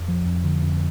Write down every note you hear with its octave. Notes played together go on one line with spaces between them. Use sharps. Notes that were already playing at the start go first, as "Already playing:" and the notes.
Already playing: F2
F3
F2
D3
F2